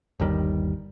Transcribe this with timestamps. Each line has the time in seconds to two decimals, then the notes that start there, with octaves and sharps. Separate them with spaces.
0.20 G1 D#2 D#3 G3